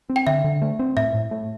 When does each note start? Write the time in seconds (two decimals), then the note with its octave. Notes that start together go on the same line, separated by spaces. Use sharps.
0.09 C4
0.16 G5
0.27 D3 E5
0.44 D3
0.62 A3
0.79 C4
0.97 A2 E5
1.14 A2
1.31 A3